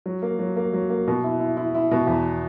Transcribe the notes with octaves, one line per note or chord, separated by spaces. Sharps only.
F#3
A#3
F#3
A#3
F#3
A#3
B2
E4
E4
E4
E4
B2
E2